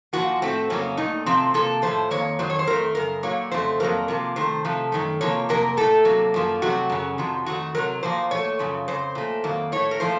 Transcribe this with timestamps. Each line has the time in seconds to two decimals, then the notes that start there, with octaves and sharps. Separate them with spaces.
0.13 A#2 F3 A#3 F#4
0.42 A2 A3 C4
0.70 F2 C#3 F#3 A#3 C#4
0.97 A#2 A3 D#4
1.26 C3 F3 A3 C4
1.54 C3 F3 A#3 A4
1.82 A2 F3 A3 C5
2.11 F2 D#3 A#3 C#5
2.39 F2 D#3 F#3 C5
2.50 C#5
2.59 C5
2.67 F2 D#3 A3 A#4
2.95 F#2 C#3 A#4
3.23 A#2 F#3 A#3 C#5
3.52 F2 C#3 F#3 A3 C5
3.80 F2 D#3 F#3 A#3 A#4
4.08 C3 F3 A#3
4.36 C3 D#3 A3 C5
4.65 C3 F3 A3
4.92 F#2 D#3 A3
5.21 C3 F3 A#3 C#5
5.49 F2 C3 F#3 A#3 A#4
5.77 A2 A3 A4
6.05 C3 F#3 A#3
6.34 F#2 F3 A#3
6.62 C3 F#3 A3 F#4
6.90 F#2 C#3 F#3
7.18 F2 C3 F3
7.46 F2 D#3 A3 F#4
7.75 C3 D#3 F#3 A#4
8.03 A#2 F3 A#3 C5
8.31 A#2 A3 C#5
8.59 F#2 C#3 F3
8.88 F2 C#3 C5
9.15 A#2 A3
9.44 F2 D#3 F#3 A#3
9.72 A2 A3 C#5
9.91 A#4
10.00 A#2 F3 A3 C5